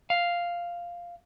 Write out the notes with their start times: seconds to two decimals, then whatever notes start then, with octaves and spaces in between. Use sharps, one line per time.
0.10 F5